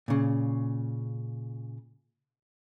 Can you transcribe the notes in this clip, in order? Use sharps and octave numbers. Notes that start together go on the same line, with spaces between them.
A#2 C#3